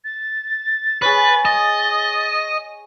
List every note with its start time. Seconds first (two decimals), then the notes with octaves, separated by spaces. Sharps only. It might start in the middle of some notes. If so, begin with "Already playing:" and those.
0.05 A6
1.02 G#4 B4 C#5
1.45 D#5